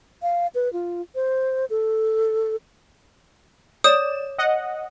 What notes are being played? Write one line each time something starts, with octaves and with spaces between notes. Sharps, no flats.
F5
B4
F4
C5
A4
C#5 D5 D#6 E7
D#5 F#5